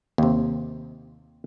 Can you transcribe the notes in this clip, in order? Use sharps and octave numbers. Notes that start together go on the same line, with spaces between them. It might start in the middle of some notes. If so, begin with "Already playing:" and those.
D#2 C3